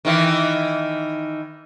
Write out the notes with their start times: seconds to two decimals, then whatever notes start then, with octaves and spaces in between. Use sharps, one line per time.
0.05 D#3 E3